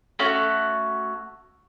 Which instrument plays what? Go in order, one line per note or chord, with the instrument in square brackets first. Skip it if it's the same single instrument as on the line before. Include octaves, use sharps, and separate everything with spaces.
[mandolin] A3 C#4 F#4